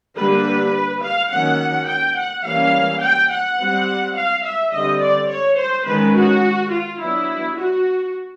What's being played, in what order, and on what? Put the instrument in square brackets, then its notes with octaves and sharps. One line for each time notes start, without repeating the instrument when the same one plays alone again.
[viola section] D3 G3 A#3 D4 B4
F5
D#3 F#3 A#3 C#4 F#5
G5
F#5
E3 G3 A#3 C#4 F5
G5
F#5
G3 C4
F5
E5
D3 G3 C4 D#5
D5
C#5
C5
D#3 G#3 C#4 B4
F#4
F4
F#3 B3 D4 E4
F#4